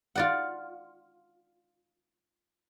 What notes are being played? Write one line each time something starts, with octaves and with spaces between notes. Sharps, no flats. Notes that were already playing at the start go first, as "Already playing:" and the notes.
F4 D5 F#5